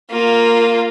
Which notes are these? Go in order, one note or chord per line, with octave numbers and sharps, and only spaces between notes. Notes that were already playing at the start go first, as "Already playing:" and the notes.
A#3 F4